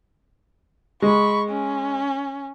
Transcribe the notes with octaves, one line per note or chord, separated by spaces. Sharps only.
G#3 B5 C#6
C#4